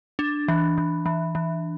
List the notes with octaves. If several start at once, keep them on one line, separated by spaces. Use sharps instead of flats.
D4
E3
E3
E3
E3